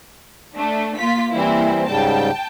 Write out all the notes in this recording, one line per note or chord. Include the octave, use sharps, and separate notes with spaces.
A3 D4
A#3 F4 B6
E3 G3 A#3 C4 E4
G#2 C#3 G3 G5 A5